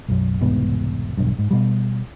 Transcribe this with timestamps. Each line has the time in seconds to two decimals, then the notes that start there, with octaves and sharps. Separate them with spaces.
0.08 B1 F#2
0.41 E1 C2 G#2 B3
1.17 E1 B1 G2
1.39 G#2
1.51 B2 G3